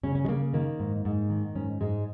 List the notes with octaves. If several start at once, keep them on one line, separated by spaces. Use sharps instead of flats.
C#3 C#4
C#4
G#3
C#3 A#3
D#3 A#3
G#2
G#2
D#3
G#2 C#4
G#2 G#3